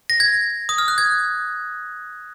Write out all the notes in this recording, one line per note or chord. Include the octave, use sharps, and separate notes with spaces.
A#6
G#6
D#6
F6
F#6
G#6